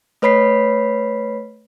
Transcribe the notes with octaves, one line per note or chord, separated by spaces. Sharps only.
A3 B4 C#5 B5 B6 C7